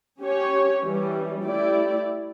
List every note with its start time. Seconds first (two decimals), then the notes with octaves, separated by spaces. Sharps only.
0.20 C#4 G4 C#5
0.83 E3 G3 C#4
1.44 A3 E4 G4 D5